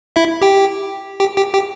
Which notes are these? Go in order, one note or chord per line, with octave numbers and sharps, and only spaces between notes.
E4 E5
G4 G5
G4 G5
G4 G5
G4 G5